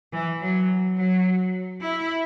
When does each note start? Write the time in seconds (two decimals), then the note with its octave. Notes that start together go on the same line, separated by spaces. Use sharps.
0.13 E3
0.41 F#3
0.97 F#3
1.82 E4